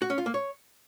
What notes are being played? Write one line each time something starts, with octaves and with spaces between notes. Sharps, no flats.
F#4
C#4
F4
A#3
C#5